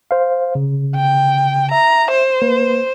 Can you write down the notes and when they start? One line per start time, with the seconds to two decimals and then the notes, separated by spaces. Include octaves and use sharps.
0.11 C5 F5
0.55 C#3
0.96 G5
1.71 E5 A#5
2.10 C5
2.42 A#3 B4